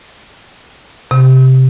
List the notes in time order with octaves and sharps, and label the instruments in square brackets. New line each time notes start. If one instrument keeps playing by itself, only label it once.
[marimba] C3